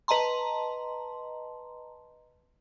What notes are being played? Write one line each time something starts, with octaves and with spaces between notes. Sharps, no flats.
B4 D#5 A5 A#5 C6